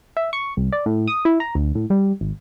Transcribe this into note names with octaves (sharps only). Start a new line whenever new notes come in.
E5
C#6
C2
D5
A2
D#6
E4
A#5
D2
A2
G3
G#1